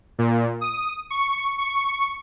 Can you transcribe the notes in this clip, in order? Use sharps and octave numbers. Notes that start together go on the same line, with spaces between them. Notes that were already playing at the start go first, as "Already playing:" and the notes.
A#2
D#6
C#6
C#6